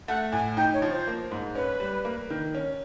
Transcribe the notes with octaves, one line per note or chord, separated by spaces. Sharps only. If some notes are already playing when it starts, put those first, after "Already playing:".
A3 F#5
A2 G#5
D#4 G5
C#5
F3
C5
A#3
G#2
C#4 B4
G3
A#3
D#3
C#4